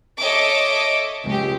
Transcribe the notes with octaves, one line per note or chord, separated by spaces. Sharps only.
A4 C#5 D#5 E5 D6
C#2 G4